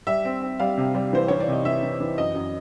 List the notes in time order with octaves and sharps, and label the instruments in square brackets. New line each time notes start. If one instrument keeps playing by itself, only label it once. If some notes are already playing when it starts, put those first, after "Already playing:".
[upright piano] G3 E5
C4
C4
G3 F5
C3
G3
E3 C5
E3 C#5
D5
C3 D#5
E3 E5
E3
E3
F#2 D#5
F#2